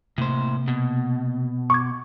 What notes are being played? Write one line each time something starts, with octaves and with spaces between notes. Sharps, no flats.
A2 C3 A#3 C5
B2
C#6 D6 G#6